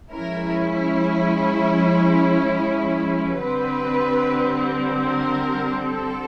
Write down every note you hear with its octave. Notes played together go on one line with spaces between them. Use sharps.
F3 G#3 C#4 E4 A#4
D3 G3 C4 B4
A#4
A4